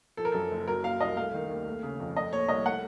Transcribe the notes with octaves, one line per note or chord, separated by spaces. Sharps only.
F3 A4
A#4
F#2 A4
F#1
F#3 A#4
A#2 F5
C2 D#5
A3 F5
D#3
D#2
A3
C#3
F2
A3 D#5
A#2 C#5
C2 D#5
A3 F#5